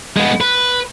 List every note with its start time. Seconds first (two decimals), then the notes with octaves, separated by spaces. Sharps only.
0.17 G#3 B3
0.41 B4